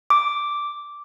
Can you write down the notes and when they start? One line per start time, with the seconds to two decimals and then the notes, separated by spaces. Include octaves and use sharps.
0.10 D6